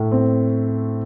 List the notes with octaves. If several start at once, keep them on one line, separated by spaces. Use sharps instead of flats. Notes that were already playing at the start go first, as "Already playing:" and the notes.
Already playing: A2 A3
C4